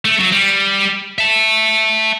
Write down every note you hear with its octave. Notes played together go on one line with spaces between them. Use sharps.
A3
F#3
G3
E5 A5